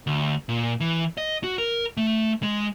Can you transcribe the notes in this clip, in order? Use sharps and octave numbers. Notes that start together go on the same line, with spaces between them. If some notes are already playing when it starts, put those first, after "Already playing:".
D2
A#2
E3
D#5
F#4
A#4
A3
G#3